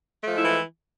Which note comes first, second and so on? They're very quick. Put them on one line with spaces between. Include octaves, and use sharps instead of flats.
A3 F3 G#3 E4 E3